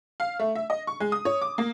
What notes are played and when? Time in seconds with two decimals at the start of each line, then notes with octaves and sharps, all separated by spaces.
0.20 F5
0.39 A3
0.55 E5
0.70 D#5
0.87 C#6
1.00 G#3
1.12 D#6
1.25 C#5
1.42 D6
1.58 A#3